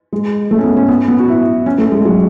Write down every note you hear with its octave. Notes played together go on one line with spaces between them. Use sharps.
G#3
A3
C#4
B3
C#4
B3
B3
F#4
E4
C#4
A3
G#3
F#3